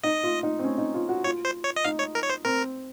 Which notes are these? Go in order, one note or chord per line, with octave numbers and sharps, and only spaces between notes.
D#4 D#5
F4
D#4
C4
C#4
D#4
F4
F#4
F4 C#5
C5
C#5
D#5
D#4 F5
C#5
A#4
C#5
C5
C4 A#4